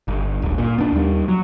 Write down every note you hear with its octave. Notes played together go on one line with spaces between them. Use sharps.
G1
D1 G1
A#2
B3 D4
D#2 G3
F#3